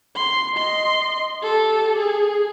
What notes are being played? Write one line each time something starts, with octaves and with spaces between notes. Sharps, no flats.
C6
D#5 C6
G4 A4
G#4